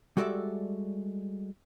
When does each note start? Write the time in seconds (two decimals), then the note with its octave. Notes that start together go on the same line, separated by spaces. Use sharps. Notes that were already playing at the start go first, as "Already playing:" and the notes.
0.17 G3 G#3 F#4 A4 D5 E5